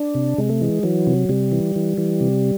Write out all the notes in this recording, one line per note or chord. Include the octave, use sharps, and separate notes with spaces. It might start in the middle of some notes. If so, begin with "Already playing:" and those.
Already playing: D4
C3
C3 G#3
A3
E3 G#3
E3 F#3
C3
C3 G3
E3
E3
E3
C3